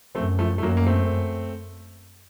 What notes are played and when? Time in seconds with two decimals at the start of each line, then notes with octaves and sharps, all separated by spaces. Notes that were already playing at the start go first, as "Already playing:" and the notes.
0.15 F#2 A3 C4
0.39 F3 A3
0.58 A3
0.62 F#2 F#3 A#3
0.77 A#3
0.86 A3 C4